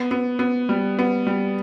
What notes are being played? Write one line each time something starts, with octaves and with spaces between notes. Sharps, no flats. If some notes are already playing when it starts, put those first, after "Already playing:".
Already playing: B3
B3
B3
G3
B3
G3